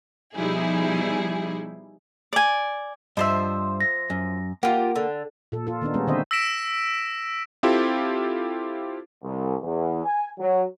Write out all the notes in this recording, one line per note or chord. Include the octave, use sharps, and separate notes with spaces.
B2 F3 G3 D#4 E4 G#4
D5 G#5
G2 F3 C5 D#5 E5 C6
A#6
F#2
A#3 F4 G4 F#5
D3
A#2 A4
F4 A4
D#3 B3 D4 D#4
G3 G#3 A#3 B3 C#4
D3 D#3 C4 C5 D#5 E5
E6 A#6 B6 D7 E7
C4 E4 F4 G4 A4
C2
E2
G#5
F#3